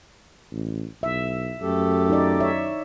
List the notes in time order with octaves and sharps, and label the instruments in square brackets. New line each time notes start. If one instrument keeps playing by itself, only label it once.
[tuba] A1
[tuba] B1 [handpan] E5
[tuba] F#2 [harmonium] A3 G4 A4
[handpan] D#4 D5
C#5 E5